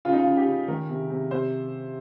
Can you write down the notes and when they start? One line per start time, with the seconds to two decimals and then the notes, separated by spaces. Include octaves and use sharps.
0.05 C#3 F4
0.13 D#4
0.20 F4
0.26 C#3
0.37 G4
0.47 C#3
0.68 D#3 A#4
0.89 C3
1.10 C3
1.31 C3 C5